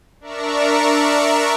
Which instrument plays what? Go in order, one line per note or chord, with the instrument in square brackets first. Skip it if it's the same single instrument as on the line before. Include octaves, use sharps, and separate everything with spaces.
[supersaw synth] D4 A#4 D5 E5 A#5 C#6